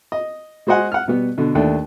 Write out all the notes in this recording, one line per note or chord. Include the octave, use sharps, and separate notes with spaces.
D#5
G#3 F#4 C5 D#5 F#5 G#5
F#5 F6
B2 G3 B3
B2 D3
D#2 A3 D4